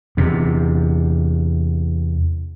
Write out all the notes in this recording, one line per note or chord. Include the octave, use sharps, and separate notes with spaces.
E2 C3